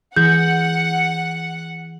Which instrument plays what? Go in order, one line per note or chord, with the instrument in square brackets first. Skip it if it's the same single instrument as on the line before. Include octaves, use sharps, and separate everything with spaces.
[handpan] E3 G#4 [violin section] F#5 [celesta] G6